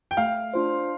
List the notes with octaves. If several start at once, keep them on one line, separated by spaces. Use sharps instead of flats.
G5
A3 F5
D4 F4 C5